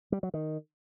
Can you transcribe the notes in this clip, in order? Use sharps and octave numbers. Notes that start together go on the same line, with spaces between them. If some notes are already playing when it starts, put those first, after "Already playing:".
G3
F#3
D#3